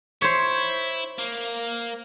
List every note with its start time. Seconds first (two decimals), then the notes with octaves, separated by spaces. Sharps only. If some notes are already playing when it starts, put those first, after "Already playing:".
0.22 E4 C5 C#5
1.18 A#3